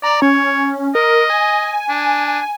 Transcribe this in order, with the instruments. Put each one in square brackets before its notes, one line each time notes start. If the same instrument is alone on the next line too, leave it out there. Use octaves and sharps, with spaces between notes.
[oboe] D5 [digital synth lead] A#5
[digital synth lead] C#4 [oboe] C#5
[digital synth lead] A#4 [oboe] D#5
[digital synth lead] G#5
[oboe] D4